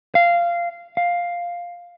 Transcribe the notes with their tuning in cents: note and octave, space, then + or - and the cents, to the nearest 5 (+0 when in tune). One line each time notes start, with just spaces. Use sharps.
F5 -15
F5 +5